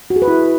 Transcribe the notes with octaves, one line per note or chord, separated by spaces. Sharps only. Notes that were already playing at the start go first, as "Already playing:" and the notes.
F#4
G#4
B4
E4